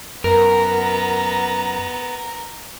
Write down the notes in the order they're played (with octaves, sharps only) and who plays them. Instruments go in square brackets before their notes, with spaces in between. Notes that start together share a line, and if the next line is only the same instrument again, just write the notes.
[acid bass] F#2 [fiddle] B3 [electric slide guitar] A#4 [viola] A#5